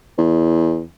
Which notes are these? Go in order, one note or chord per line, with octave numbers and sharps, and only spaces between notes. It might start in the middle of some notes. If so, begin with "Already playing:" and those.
E2